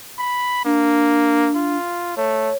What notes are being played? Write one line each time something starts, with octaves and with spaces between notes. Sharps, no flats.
B5
A#3 D4
F4
A3 C#5